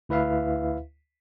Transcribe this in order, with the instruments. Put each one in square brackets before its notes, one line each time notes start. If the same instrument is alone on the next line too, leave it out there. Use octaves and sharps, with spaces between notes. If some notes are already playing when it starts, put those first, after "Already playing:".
[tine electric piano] D2 E4 B4 E5 F5